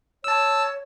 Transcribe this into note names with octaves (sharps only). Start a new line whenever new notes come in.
C#5 A5 E6